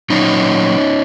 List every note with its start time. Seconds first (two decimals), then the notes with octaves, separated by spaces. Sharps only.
0.10 A#2 F#3 C#4 D#4